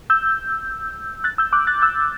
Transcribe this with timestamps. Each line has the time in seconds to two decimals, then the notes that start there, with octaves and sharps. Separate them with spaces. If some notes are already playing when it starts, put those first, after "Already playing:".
0.10 E6 G6
1.24 F#6 A6
1.38 E6 G6
1.53 D6 F#6
1.67 F#6 A6
1.81 E6 G6